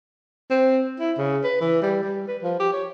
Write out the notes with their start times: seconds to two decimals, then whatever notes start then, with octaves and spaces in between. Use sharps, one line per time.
0.50 C4
1.00 E4
1.18 C#3
1.44 B4
1.61 E3
1.82 G3
2.03 G3
2.28 B4
2.43 F3
2.60 G4
2.73 C#5